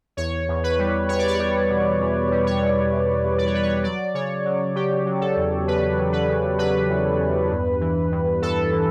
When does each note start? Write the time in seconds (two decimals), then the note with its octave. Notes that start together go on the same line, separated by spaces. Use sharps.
0.17 E2 C#5
0.49 E2
0.64 B4
0.79 G3
1.09 E2 C#5
1.19 D5
1.28 C#5
1.40 G3
1.70 B2
2.01 E2
2.31 G3
2.47 C#5
2.61 E2
2.92 E2
3.23 E2
3.38 D5
3.47 C#5
3.53 E2 B4
3.63 C#5
3.84 F#3 D5
4.14 C#3 C#5
4.45 F#3
4.75 F#3 G4
5.06 F#3
5.21 A4
5.36 E2
5.67 C#3 B4
5.98 F#3
6.13 B4
6.28 C#3
6.59 F#3 B4
6.90 E2
7.20 E2
7.51 G2
7.81 E3
8.12 G2
8.42 G2 A4
8.72 E3